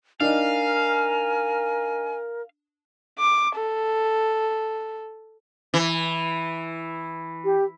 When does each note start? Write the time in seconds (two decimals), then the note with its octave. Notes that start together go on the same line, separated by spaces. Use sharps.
0.21 D4 D#4 A#4 F5 G#5
3.19 D6
3.56 A4
5.74 E3
7.44 G4